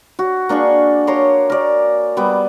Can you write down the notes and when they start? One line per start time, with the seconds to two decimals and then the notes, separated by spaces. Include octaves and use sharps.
0.19 F#4
0.49 A#3 D4 G#4 C#6
1.07 C#5 A#5 C6 D6
1.50 A#4 D5
2.17 G3 B3 D6